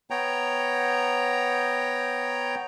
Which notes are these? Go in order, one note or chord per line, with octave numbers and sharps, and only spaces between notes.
B3 C#5 G5 A#5